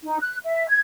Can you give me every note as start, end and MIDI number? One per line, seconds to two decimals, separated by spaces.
0.03 0.17 63
0.19 0.34 90
0.43 0.67 76
0.67 0.77 92